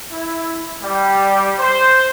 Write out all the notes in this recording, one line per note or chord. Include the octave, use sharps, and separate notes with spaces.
E4
G3
C5